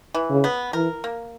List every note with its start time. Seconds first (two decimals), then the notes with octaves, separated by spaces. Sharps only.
0.14 E3
0.30 C#3
0.44 B3
0.73 E3 A#4
1.04 A#3